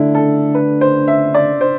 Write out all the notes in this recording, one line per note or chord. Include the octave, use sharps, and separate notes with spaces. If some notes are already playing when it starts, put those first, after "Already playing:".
Already playing: D3 A3 D4 E4
A4
B4
C5
E5
D5
C5